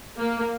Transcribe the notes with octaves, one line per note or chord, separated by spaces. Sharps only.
A#3